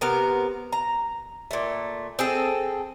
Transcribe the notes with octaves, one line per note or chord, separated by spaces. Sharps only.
C3 B3 A#4
A#5
A#2 A3
C4 G#4 A4